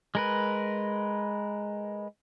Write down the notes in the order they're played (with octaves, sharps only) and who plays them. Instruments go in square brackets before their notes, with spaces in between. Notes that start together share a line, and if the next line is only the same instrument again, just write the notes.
[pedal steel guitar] G#3 A#4 B4